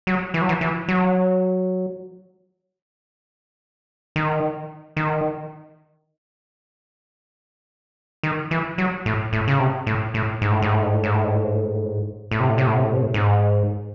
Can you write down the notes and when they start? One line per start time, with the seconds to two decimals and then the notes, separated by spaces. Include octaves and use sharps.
0.07 F#3
0.34 E3
0.41 F#3
0.49 E3
0.61 E3
0.88 F#3
4.16 D#3
4.96 D#3
8.23 D#3
8.51 E3
8.78 F#3
9.06 A2
9.33 A2
9.48 C#3
9.59 C3
9.87 A2
10.14 A2
10.42 G#2
10.51 A2
10.62 G#2
10.73 A2
10.82 G#2
10.93 A2
11.04 G#2
11.14 A2
11.24 G#2
11.34 A2
11.44 G#2
11.54 A2
11.65 G#2
11.74 A2
11.85 G#2
12.31 A2
12.40 C3
12.49 A2
12.58 C3
12.67 A2
12.76 C3
12.84 A2
12.93 C3
13.02 A2
13.14 G#2